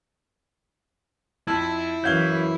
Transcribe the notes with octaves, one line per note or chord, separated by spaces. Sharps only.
F2 E4 A5 E6 G#6
F#2 E3 C#4 F5 G6 G#6 G7